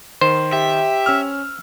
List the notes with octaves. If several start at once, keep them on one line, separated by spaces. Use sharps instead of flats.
D#3 C5
G4 E5
C#4 E6 F6